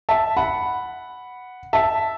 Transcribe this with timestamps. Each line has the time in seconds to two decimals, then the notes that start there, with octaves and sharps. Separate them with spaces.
0.09 E5 A5
0.37 F#5 B5
1.73 E5 A5